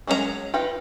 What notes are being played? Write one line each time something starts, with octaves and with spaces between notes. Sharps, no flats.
F#3 G#3 C#4 D#4 A#5
D#4 F4 B4 G5